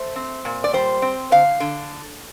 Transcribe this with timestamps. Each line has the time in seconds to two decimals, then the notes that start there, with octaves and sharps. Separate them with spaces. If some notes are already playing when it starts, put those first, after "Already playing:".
Already playing: A3 C5
0.16 C4
0.45 A#2
0.64 D5
0.73 G3 C5
1.02 C4
1.32 D3 F5
1.60 D3